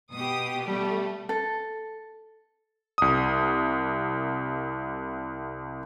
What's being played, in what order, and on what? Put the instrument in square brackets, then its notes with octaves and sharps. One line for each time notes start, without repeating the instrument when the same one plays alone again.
[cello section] B2 B3 G4 [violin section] D#6
[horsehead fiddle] G3 [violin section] A3
[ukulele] A4
[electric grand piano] C2 D#6